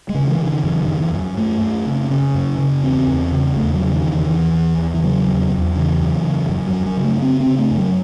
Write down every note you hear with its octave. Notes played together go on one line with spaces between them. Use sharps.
G#3
C#3
E3
C#3
D#3
F#2 E3
D#3
F#2
E3
F#2 E3
F#3
F#2 A3
F#2
C#3
C#3 C#4
F#2
C#3
E2 C4
E2
C#3
E2 A3
F#3
C#3
D#3
E2
D#3
E2 E3
E2
E2
E3
C#3 F#3
E2
E2
C#3 E3
F#2
C#3
F#2
F#3
F#2
F#3
C#3
A3
C#3 C4
C4
C#3
A3
F#2
F#3